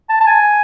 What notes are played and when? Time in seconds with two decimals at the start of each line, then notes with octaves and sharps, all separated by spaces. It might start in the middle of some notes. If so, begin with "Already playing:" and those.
0.09 A5
0.21 A5
0.26 G#5